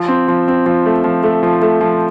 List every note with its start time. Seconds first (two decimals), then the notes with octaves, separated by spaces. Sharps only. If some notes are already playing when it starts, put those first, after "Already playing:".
Already playing: F3
0.08 C4
0.28 F3
0.48 C4
0.66 F3
0.86 A3
1.04 F3
1.24 A3
1.43 F3
1.62 A3
1.81 F3